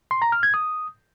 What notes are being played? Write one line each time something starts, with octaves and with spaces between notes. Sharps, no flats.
C6
A#5
F6
G#6
D#6